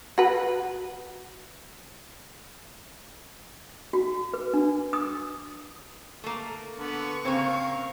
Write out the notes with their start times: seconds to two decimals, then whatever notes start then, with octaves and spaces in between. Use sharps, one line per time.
0.18 F#4 B4
3.93 F#4
4.34 B4
4.54 D4
4.93 D#6
6.24 A3 A#3
6.78 D3 B3 C#6
7.25 C#3 A#3 C4 F5